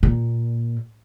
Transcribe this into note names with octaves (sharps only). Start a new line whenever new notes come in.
A#2